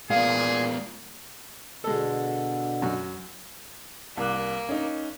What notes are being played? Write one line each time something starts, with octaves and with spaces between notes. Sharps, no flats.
A#2 G#3 B3 G#4 F5
B2 D3 G#3 A4
F#2 F#4
C2 A#3 F#6
C#4 D#4